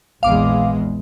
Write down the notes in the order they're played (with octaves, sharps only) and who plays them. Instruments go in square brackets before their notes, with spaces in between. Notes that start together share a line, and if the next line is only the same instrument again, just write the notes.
[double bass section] A#1 E2 G#3 [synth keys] F5 D6